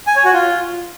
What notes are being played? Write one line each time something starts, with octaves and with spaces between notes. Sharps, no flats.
G#5
C#5
F#4
F4